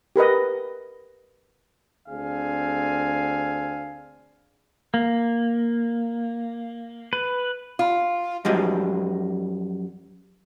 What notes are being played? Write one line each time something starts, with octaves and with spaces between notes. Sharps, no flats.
G4 A#4 B4 D#5
D2 C4 D4 G#4 F5 G#5
A#3
B4
F4
F#2 F3 G3 G#3